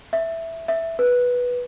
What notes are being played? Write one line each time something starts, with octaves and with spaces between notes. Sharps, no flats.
E5
E5
B4